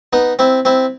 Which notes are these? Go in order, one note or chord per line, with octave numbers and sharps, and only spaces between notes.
B3 D#4
C4 E4
C4 E4